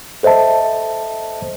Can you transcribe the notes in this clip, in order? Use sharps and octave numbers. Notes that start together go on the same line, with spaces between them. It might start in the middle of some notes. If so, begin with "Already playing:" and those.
A4 C5 D#5 E5 A5